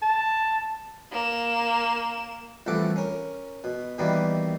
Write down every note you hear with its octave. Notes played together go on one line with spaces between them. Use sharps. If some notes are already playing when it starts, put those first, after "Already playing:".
A5
A#3 E7
C2 E3 F3 A3 F#5 D6
C#4 A#4
B2
B2 D#3 E3 G3 A#3 B3